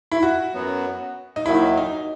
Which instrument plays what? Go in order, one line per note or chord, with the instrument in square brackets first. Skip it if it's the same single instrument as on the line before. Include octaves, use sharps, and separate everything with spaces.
[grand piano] E4
F#4
[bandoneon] F#2 F#3 B3
[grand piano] D#4
[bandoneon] D#2 D#3 F#3 [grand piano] E4
[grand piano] D#4